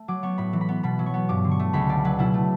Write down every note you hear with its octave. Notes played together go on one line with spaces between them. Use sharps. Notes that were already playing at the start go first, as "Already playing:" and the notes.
Already playing: A3
F#3 D6
B3 C#6
A2 B5
E3
B5
B3
B2 B5
F#3
C#6
B3
G2 D6
D3
C#6
A3
C#2 B5
B2 D5
F#3 B4
B2 E4
A3